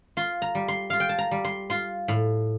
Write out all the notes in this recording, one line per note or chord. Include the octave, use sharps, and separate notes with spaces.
F4 C6
A#5
G3
C6
F4 F5
G5
A5
A#5
G3
C6
F4 C6
A2